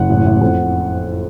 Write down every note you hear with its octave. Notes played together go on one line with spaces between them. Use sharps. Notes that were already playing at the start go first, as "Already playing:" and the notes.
Already playing: F#1 F#5
A1
A1
F2